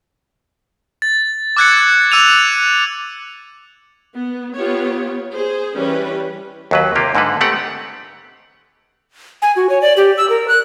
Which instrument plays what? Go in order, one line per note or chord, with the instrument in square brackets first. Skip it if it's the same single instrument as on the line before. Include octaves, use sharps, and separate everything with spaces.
[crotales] A6
D6 E6 F#6 G#6 A6 C#7
D6 E6 D#7 F7
[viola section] B3
B3 F4 G4 C#5
G#4 C5
E3 G3 C#4 B4
[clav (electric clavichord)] D#2 F#3 B4
C3 A#3 F4 G4
G#2 D3 A#3 A4 B4
A3 B3 C4 G4 F#5
[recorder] G#5
F#4
C#5
D5
G4
E6
A#4
F#6